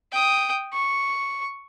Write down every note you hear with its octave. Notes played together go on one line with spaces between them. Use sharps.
G5 D#6
C#6